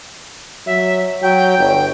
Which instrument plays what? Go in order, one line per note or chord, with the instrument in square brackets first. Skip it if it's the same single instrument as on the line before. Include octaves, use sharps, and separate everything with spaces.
[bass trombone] F#3 [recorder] E5
[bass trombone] F#3 [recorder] G5
[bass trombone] G1